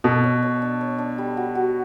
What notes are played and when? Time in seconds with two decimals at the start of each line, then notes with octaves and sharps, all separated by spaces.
0.04 B2 A4
0.24 C#5
0.43 C#5
0.62 D4
0.81 C#5
0.99 D4
1.18 G3
1.37 F#4
1.55 F#4